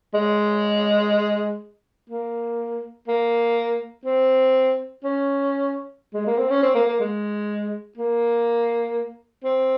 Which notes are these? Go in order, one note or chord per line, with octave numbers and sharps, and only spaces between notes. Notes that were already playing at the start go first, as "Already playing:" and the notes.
G#3
A#3
A#3
C4
C#4
G#3
A#3
C4
C#4
C4
A#3
A#3
G#3
A#3
C4